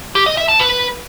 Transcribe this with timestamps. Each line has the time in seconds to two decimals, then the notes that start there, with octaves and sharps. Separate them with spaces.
0.15 G4
0.26 D#5
0.37 E5
0.48 A5
0.59 B4